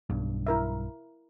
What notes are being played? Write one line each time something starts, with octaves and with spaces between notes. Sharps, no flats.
B1 G2
E4 A#4 E5